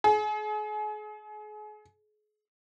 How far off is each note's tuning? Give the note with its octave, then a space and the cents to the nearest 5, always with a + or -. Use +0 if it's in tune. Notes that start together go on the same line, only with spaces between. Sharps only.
G#4 +35